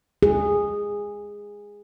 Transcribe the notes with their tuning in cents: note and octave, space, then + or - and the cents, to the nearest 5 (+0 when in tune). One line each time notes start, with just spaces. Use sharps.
G#4 -15